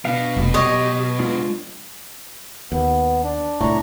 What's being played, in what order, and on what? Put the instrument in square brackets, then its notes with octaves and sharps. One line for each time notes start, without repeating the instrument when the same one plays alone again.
[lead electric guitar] B2 [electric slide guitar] D4 B4 F5
[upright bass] F1 A3
[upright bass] F#3 [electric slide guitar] G4 [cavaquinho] C#5 D#5
[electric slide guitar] G#3 D4 F4
[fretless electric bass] D#2 [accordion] B3
[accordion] D4
[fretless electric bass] C2 A2 [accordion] D4 A#5 C#6